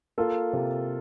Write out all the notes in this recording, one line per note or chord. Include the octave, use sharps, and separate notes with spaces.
A#3 F4 A4
C3